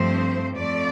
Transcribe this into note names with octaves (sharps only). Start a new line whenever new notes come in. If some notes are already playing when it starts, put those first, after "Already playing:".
Already playing: G2 F3 A3 C4 C5
F2 F3 A3 D5